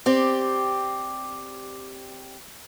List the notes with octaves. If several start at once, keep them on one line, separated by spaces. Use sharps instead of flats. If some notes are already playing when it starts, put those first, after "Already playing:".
C4 G4 D5